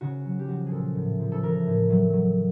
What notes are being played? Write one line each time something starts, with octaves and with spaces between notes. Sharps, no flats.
C#3 F#4
F#3
G4
F3 F#4
A#2 G#4 A4
A2
F3
A4
E3 A#4
A2
F#3
F#3